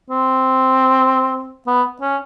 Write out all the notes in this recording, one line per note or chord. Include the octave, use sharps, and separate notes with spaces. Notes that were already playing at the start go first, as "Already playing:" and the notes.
C4
B3
C#4